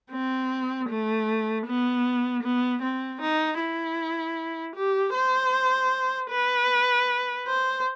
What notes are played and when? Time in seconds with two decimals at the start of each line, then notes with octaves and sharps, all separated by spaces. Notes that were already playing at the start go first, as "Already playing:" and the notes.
0.11 C4
0.88 A3
1.66 B3
2.43 B3
2.82 C4
3.21 D#4
3.60 E4
4.76 G4
5.14 C5
6.31 B4
7.47 C5